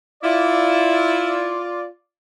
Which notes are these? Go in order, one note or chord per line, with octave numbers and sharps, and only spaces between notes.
E4 F4 D5